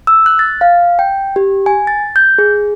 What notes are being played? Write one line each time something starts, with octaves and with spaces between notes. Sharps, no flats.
E6
F#6
A6
F5
G5
G4
G#5
A6
G6
G#4